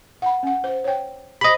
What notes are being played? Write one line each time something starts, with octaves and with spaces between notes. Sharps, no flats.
F#5 B5
C#4 F#5
C5
C#5 G5
G4 C5 D#5 B5